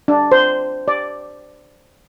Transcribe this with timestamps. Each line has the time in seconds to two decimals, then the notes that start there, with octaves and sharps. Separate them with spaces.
0.08 D4
0.32 C5
0.88 D5